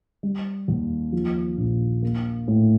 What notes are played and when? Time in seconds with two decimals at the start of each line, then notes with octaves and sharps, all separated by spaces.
0.23 G3
0.68 D#2
1.13 F3
1.58 A#1
2.03 A#3
2.48 A2